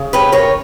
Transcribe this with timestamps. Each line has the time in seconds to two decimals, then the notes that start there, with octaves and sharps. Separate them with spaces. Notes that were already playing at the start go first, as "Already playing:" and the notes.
Already playing: C#3
0.13 C#4 G4 B4
0.32 A#4 C#5